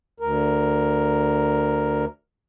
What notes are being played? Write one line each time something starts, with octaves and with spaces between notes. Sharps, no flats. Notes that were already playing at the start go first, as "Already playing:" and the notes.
D2 A#4